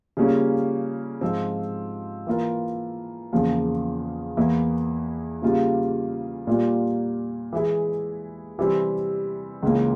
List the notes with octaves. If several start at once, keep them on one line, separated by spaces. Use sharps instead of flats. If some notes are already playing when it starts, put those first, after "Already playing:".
C#3 G3 A#3 C#4 F4
G#2 F3 C4
E3 A#3 F4 A#4
E2 C#3 F3 A#3
E2 E3 A#3 E4
C#3 G3 A#3 F4
A#2 G3 A#3 F4
E3 G#3 E4 G#4
C3 E3 G3 C4
C#2 C#3 E3 A#3 C#4